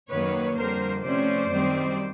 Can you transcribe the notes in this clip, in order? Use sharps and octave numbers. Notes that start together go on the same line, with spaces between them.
F#2 D#3 F#3 A#3 B4 C#5
F2 D3 G3 A#4 C5
C3 F3 A3 C#4 C5 D5
F#2 D#3 G3 C4